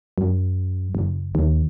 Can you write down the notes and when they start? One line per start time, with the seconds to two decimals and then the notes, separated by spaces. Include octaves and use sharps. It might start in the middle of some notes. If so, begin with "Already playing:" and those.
0.18 F#2
0.95 F#1
1.35 D#2